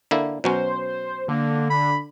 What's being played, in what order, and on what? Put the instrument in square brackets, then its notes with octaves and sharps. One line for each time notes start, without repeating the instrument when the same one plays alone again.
[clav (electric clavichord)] D3 A#3 E4
[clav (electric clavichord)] B2 F#3 C#4 [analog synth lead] C5
[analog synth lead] D3 [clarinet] A#3
[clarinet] B5